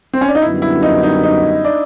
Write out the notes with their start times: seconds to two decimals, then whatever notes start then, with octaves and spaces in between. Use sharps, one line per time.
0.13 C4
0.21 C#4
0.28 D4
0.35 D#4
0.42 F#2 D3 G3 B3 E4
0.62 E4
0.82 D#4
1.03 D#4
1.23 D#4
1.64 D4